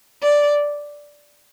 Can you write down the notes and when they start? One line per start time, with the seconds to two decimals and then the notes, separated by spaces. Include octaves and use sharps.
0.23 D5